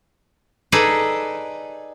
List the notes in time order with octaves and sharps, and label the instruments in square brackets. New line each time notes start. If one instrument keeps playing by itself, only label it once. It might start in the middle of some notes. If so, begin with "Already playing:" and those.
[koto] D#4 G#4 A4 B4 D5